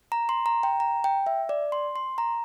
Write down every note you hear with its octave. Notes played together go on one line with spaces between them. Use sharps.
A#5
C6
A#5
G5
A#5
G5
E5
D5
C6
C6
A#5